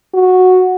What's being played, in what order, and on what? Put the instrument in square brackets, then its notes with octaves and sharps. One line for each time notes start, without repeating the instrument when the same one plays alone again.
[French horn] F#4